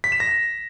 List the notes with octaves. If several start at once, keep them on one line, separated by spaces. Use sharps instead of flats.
B6
E7
A#6